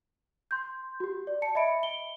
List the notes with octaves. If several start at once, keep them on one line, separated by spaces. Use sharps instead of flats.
C6 G6
F#4 G4
D5
A5 C#7
D#5 E5 B5 C#7 D7
G7